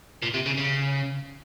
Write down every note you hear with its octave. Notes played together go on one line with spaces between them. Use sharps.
A#2
C3
C#3
C#3